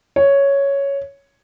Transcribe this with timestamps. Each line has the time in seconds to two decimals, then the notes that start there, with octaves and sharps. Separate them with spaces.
0.16 C#5